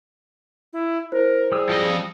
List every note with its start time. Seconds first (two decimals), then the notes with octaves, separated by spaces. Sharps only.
0.73 E4
1.12 E4 A#4 C5
1.52 G3 G#4 D#6 E6
1.69 F3 D#5